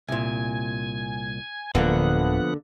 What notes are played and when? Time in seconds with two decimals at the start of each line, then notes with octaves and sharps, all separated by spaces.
0.09 C2 A#2 G#5
1.75 D1 D3 F3 A#3 B3 D4 F#5